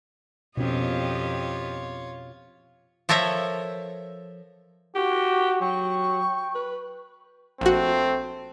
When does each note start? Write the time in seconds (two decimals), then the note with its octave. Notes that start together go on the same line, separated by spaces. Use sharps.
0.57 F2 B2 C#4 F4 G4 C#5 D#5
3.09 F3 A4 A#4 C#5 E5
4.95 F#4 G4
5.61 F#3 G5 C#6
6.55 B4
7.61 A#1 A3 C4 F#4